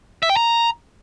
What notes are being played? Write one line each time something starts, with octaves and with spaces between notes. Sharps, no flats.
E5
G5
A#5